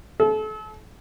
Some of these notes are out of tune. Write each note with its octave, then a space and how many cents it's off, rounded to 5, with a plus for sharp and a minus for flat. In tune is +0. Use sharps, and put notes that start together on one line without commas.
A4 -35